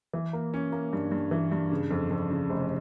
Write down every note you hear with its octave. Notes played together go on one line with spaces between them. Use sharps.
E3
A#3
C#4
A#3
G2
G2
E3
G2
C#3
F2
F2
C#3
F1